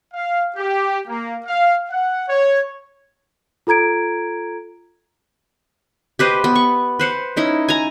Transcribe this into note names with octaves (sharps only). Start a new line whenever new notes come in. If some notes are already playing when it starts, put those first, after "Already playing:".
F5
G4
A#3
F5
F#5
C#5
F4 A4 A#5 G#6 D7
G4 B4 C5 D#5
B3
C#6
B4 C5 F#5
C#4 D#4 E4
G#5 A#5